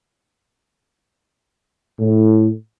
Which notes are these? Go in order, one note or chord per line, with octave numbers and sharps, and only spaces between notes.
A2